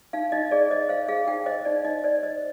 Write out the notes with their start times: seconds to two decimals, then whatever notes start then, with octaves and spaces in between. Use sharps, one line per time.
0.13 D#4 F5
0.32 D#4 D#5
0.51 G#4 D5
0.71 C5 D#5
0.89 C5 F5
1.08 G#4 F5
1.28 D#4 G5
1.46 C5 D#5
1.65 D#4 D5
1.85 D#4 D#5
2.04 C5 D5
2.23 C5 D#5